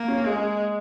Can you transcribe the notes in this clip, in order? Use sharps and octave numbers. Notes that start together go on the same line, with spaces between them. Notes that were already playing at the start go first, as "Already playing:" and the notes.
Already playing: A#3
C#4
G#3 G#4